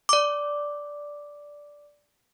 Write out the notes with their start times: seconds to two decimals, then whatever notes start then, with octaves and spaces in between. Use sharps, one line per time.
0.09 D5 D6